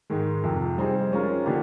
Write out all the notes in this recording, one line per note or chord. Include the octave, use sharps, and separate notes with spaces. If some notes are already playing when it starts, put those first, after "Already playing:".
G#2 D#3 G#3
F2 C3 F3
G3 C4 D#4 G#4
G#3 C#4 F4 A#4
D3 F3 A#3 D#4 G4